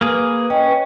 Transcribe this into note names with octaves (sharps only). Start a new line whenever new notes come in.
A#3 G#4 B4
C#4 D#5 G5